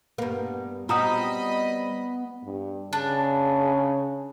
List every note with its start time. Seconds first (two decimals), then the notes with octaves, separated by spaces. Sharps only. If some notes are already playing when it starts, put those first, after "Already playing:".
0.18 G2 A#3 B3
0.89 G3 C4 F4 F#4 D#5 A#5 B5 D#6
2.45 G2
2.93 C#3 D4